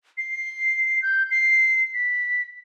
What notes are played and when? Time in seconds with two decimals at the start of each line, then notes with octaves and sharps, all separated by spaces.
0.18 C7
1.02 G6
1.31 C7
1.94 B6